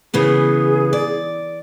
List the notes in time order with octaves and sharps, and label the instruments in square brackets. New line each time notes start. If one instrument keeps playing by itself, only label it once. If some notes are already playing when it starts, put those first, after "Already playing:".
[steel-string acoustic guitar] C#3 E3 B3 [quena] G#4
[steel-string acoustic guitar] D5